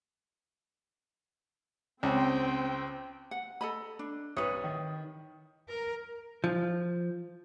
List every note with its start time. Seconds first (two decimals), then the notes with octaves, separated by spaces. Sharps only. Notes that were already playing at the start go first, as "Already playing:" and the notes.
2.03 C#2 C4 G5
3.31 F#5
3.61 A4 D#5 B5
3.99 D4
4.36 C2 B4 C#5 D#6 F#7
4.64 D#3
5.69 A#4
6.44 F3